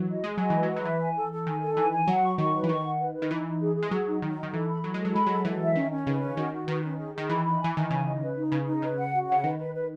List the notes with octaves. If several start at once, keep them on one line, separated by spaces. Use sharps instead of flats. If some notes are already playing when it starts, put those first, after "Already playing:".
Already playing: E3 F#3
D#5
G#3 G#5
F#3 D#5
E3 B4
F#3
B4
F#3
E3 E5
G#5
A4
A4
D#3 G#5
A4
E3 G#5
G#5
F#3 F#5
C#6
D#3 C#6
B4
E3
D#3 C#6
F#5
B4
B4
D#3
E3 D#4
D#4
G#4
G#4
G#3
F#3 G#4
D#4
D#3 D#4
D#4
D#3
E3 A4
B5
F#3 A4
G#3 A4
F#3
G#3 B5
F#3 A4
E3 A4
E5
D#3 C#4
C#4
C#3 B4
C#4
D#3 F#4
F#4
D#3 B4
C#4
G#4
D#3 G#4
E3 B5
B5
E3 G#5
D#3 G#5
C#3 G#5
D#5
B4
D#4
C#3 B4
D#4
C#3 B4
F#5
F#4
C#3 F#5
D#3 B4
B4
B4